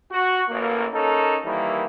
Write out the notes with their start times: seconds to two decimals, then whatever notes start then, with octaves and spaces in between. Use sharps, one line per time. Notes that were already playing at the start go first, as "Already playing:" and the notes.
0.12 F#4
0.50 A1 A#3
0.93 C#4 D#4 A4 A#4
1.45 D#3 E3 G3 A#3 E4